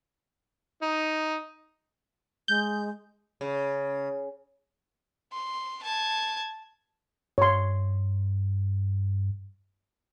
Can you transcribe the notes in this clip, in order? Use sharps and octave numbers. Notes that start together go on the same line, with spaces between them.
D#4
G#3 G6
C#3
C6
A5 G#6
G2 C#5 C6